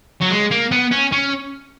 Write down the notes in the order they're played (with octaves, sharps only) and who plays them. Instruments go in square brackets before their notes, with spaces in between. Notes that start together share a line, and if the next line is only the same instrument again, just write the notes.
[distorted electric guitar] F#3
G#3
A#3
B3
C#4
C#4